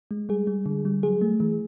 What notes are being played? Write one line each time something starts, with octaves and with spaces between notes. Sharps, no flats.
G#3
G3 G#4
G3
D3
G3
F#3 G#4
A3
E3